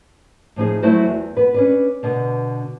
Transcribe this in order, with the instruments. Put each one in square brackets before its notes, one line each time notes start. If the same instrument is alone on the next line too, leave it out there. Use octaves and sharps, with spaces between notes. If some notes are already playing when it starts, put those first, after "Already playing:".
[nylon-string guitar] A2 F3 D#4 G#4
F#3 A3 E4 F#4 A4 C5
E2
B3 B4
C#4 D4 B4
B2 D3 B3